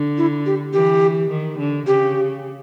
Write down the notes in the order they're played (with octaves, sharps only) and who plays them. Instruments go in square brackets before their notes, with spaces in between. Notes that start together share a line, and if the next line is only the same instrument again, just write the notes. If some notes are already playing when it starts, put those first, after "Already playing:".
Already playing: [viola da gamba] D3
[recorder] E4
G4
[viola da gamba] E3 [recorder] G4
[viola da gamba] D#3
D3
[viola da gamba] C#3 [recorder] G4